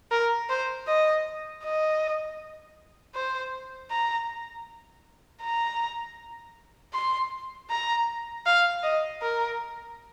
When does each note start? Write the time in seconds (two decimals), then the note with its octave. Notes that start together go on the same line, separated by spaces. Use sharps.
0.11 A#4
0.49 C5
0.87 D#5
1.64 D#5
3.15 C5
3.91 A#5
5.42 A#5
6.94 C6
7.70 A#5
8.46 F5
8.83 D#5
9.22 A#4